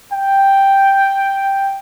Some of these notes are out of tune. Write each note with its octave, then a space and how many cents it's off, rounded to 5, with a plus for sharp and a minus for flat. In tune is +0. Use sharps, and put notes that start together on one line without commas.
G5 +0